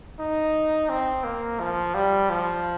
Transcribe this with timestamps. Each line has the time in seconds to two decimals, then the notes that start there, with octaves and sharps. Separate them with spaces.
0.19 D#4
0.89 C4
1.24 A#3
1.60 F3
1.94 G3
2.30 F3